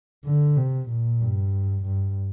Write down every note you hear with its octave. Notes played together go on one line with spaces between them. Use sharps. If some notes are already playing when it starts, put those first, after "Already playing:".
D3
C3
A#2
G2
G2